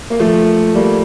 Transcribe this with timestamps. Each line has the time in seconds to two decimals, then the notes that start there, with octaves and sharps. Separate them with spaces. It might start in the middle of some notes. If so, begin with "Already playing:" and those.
0.10 A#3
0.20 F3 A3
0.75 G3 A#3